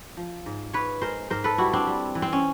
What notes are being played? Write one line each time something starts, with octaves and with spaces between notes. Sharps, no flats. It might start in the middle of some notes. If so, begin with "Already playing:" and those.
F3
G#2
G#2 B4 C#5
G#3 A#4 C5
G#2 A#4 C5
A4 B4
G3 E4 F#4
C4 D4
G3
E3
C4
C#4